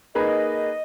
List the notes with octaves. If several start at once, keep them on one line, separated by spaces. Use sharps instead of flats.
A#3 D#4 G#4 B4 D#5